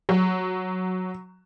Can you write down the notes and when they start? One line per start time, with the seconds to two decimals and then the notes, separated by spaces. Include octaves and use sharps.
0.09 F#3